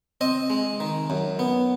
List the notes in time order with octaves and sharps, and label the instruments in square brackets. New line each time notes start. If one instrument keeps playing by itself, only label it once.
[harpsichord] C4 D#5
G#3
D#3
F#2
B3